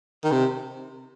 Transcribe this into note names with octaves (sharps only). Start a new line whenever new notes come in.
D#3
C3